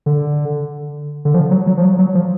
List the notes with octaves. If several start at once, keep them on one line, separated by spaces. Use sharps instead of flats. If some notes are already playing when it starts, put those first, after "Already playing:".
D3
D3
F3
F#3
F#3
F3
F#3
F#3
F3